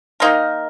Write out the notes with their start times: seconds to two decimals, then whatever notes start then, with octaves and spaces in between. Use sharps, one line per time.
0.20 D#3 A#3 D#4 A#4